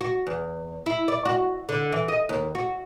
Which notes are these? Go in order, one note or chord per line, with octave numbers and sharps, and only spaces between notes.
F#4
E2
E4
D5
F#4
D3
E3
D#5
D#2
F#4